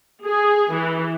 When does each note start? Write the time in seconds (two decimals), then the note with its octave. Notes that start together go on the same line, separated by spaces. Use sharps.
0.25 G#4
0.71 E3